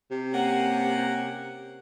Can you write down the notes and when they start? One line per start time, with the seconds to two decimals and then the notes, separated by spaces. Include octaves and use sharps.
0.11 C3
0.33 A#3 C#4 F#5